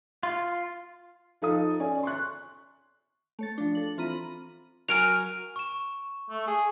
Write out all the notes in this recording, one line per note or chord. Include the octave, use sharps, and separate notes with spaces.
F4
F3 D#4 A4 F5 D#6
C#4 A4 C#5 D5 G#5
C6 C#6 F#6
A3 C#5 A6
F3 D4
A4 F#7
E3 C4 F4 A#5 B5 D#7
F#3 A#4 G#5 F6 D7 F7
C#6 E7
A3
G#4